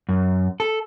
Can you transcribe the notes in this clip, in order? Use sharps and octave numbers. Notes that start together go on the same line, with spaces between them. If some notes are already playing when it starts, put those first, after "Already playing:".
F#2
A4